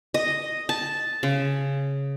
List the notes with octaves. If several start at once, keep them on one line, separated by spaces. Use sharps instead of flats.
D#5
A5
C#3